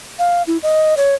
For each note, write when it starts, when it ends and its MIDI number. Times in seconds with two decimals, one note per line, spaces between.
0.19 0.43 77
0.47 0.57 64
0.63 0.95 75
0.97 1.15 73